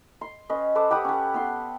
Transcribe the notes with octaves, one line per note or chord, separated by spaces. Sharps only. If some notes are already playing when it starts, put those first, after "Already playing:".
C6
C#4 B4 D#5
A4 B4 C5 D6
G4 F#5 B5 D#6
C#4 B4
B3 B4 C6